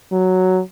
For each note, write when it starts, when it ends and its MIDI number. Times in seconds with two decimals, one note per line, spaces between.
0.12 0.61 54